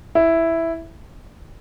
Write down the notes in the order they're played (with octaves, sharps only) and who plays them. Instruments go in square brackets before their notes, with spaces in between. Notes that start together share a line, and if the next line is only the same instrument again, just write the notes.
[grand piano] E4